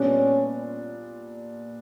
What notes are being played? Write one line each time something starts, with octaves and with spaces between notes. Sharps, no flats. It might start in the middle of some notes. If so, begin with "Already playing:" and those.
Already playing: A#2 G3 B3 C#4 D4